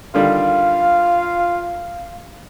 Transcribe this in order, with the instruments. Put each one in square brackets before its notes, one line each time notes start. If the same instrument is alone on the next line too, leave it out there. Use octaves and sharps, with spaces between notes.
[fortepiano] D3 D#3 G3 [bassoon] F4 [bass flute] F5